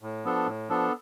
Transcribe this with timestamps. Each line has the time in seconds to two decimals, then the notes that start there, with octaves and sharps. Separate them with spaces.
0.02 A2
0.25 F3 B3 D4 A4
0.47 A2
0.69 F3 B3 D4 A4